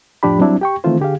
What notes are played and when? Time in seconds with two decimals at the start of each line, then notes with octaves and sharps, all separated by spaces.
0.23 F2 A2 F3 D4 G4 B5
0.39 F#3 G3 C4 D4 E4
0.61 G4 G5 C#6
0.84 D#3 E3 A3 C4 F4 C5
1.00 D3 G4 G#4 F5